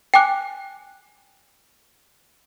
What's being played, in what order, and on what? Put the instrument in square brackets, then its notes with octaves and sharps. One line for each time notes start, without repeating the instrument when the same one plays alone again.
[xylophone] G5 G#5 D6 F#6